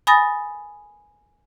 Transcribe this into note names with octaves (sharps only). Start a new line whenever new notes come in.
G#5 B5 D#6 A6 A#6